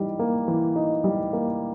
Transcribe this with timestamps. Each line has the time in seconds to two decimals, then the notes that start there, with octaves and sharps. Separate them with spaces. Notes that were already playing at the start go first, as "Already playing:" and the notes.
Already playing: E3 G3 D#4
0.19 A#3
0.48 E3
0.76 D#4
1.04 G3
1.33 A#3